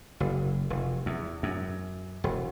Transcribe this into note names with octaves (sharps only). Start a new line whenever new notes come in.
F#1
F1
E2
F#2
E1